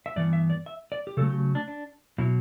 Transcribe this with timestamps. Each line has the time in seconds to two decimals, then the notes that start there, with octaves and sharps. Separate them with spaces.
0.06 E5
0.16 G2 E3 B3 D5
0.33 E5
0.50 D5
0.66 E5
0.92 D5
1.07 G4
1.17 C#3 F#3 A3 A4
1.30 G4
1.55 D4
1.68 D4
2.18 B2 F#3 E4